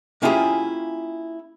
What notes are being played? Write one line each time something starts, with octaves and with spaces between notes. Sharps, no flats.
A#3 C#4 E4 F4 G4 G#4